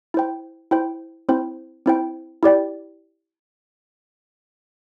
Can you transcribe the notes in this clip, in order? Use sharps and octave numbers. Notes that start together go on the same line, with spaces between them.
E4 C5 G5
E4 C5 G5
C4 E4 C5 G5
C4 E4 C5 G5
E4 G4 D5 G5